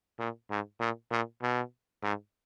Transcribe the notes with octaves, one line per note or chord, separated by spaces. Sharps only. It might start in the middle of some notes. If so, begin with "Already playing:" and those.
A#2
G#2
A#2
A#2
B2
G#2